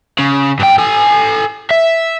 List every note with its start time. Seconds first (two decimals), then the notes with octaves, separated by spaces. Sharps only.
0.19 C#3
0.59 G2 G5
0.78 A4 G#5
1.70 E5